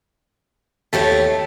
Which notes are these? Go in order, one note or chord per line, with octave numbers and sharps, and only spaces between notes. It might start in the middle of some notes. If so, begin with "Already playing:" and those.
D#2 A3 G4 C#5